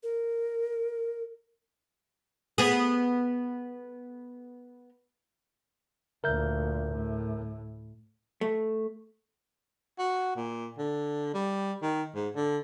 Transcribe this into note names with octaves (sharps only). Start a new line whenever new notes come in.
A#4
B3 G#4
D2 A#2 A#4 E5 G6
A2
A3
F#4
A#2
D3
G3
D#3
G#2
D3